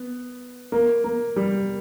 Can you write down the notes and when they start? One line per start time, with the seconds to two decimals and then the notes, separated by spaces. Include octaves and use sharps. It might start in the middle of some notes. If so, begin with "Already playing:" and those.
Already playing: B3
0.72 A#3
1.04 A#3
1.36 G3